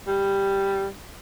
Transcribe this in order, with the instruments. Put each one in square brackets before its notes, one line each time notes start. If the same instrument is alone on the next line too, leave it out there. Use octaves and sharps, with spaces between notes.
[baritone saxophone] G3